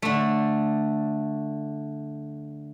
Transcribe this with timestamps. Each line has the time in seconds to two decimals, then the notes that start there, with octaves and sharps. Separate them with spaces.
0.02 D3 A3